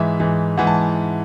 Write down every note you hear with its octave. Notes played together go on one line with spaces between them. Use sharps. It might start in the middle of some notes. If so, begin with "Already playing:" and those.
Already playing: G#2 E3 E5
G#2 E3
G#2 E3 F#5
A5